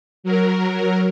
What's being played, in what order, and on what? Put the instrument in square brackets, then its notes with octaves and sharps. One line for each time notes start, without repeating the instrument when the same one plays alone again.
[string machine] F#3 A#4